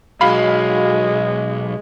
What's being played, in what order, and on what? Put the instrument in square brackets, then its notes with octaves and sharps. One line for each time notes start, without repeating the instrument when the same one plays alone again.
[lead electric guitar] B1 [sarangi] G#3 [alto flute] F#4 [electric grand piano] F5 B5